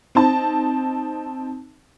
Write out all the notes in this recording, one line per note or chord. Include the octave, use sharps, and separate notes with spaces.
C4 D#4 A5